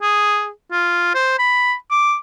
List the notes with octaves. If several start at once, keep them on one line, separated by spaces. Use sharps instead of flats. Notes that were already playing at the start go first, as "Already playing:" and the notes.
G#4
F4
C5
B5
D6